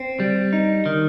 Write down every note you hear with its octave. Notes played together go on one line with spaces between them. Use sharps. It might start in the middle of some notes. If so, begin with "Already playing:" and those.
Already playing: C4
G3
D#4
D#3